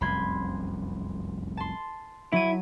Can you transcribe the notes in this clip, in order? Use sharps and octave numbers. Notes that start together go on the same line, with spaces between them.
F1 C2 F#2 B5 C6 G#6
A5 C6
F#3 E4 D#7